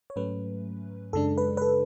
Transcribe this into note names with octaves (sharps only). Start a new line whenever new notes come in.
C#5
G#2 F#3 A3 C#4 B4
F#2 C#3 G#3 D4 A4
B4
B4
A4